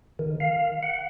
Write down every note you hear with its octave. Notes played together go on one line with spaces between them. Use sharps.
D#3
F5
F#5